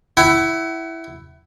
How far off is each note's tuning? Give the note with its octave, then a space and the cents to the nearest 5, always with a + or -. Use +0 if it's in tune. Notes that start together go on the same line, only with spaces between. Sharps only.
E4 +0 F#5 +35